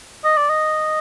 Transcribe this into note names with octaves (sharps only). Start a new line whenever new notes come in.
D#5
D5
D#5